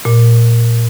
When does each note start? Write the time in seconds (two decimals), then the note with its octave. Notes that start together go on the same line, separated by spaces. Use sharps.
0.05 A#2